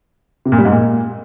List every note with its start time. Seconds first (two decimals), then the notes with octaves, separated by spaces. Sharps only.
0.45 C3
0.52 A#2
0.59 G3
0.65 G#2
0.72 A#2